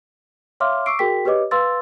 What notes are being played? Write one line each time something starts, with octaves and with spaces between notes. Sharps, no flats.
C#5 E5 F5 C6 D6 F6
C#6 D6 E6 C7 D7
F#4 G#4 A#4 G5 B6
G4 B4 C#5 D#5 D6
B4 F5 C6 E6 A6